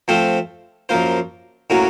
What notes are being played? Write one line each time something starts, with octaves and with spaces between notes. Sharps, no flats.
F3 A3 C4 F4 C5
F#2 F3 A#3 F4 C5
A2 F#3 A#3 C#4 F#4